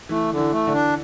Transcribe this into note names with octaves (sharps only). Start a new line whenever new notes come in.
E3 A3
D3
E3
A3
D3
D4